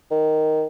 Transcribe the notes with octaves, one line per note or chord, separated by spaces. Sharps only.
D#3